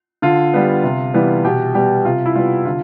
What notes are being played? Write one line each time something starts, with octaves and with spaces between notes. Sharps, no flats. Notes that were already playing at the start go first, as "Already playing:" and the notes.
D3 F4
G3 B3
C3
E3 G3 B3
B2 G4
G3 B3 G4
C3 F4
E4
G3 B3 F4
D3 F4